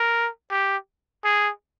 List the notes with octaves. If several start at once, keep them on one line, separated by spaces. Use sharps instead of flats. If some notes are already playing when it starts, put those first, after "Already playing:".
Already playing: A#4
G4
G#4